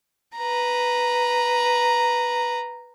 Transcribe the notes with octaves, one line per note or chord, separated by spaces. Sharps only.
B4 A#5